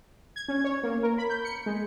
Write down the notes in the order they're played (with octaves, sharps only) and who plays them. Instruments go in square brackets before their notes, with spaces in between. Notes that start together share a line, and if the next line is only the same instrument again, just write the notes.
[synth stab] G#6
C#4
C#5
A#3
A#4
B5
G6
C#7
G#3